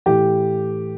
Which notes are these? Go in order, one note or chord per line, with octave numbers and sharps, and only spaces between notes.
A2 E3 G4